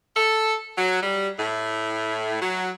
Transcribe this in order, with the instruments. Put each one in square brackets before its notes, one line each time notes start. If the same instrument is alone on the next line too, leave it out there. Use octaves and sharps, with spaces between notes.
[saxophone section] A4
F#3
G3
A2
F#3